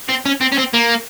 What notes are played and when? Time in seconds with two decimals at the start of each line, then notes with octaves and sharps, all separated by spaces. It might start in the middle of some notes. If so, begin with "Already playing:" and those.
0.09 C4
0.26 C#4
0.41 C4
0.52 C#4
0.58 C4
0.74 A#3